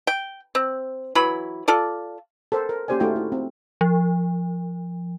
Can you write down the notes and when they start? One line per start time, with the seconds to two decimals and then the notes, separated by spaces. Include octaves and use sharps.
0.07 G5
0.55 C4
1.15 E3 F#3 B5
1.68 F4 A4 D5
2.52 A4 A#4 C5
2.69 A#4
2.88 A#3 C#4 G4 C5 D5 G#5
3.00 A3 D#4 F4 F#4 G5
3.16 E4
3.32 C4
3.81 F3